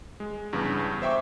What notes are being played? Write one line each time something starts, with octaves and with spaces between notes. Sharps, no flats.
G#3
E2 G2 C#3
C5 E5 G5 C#6 D6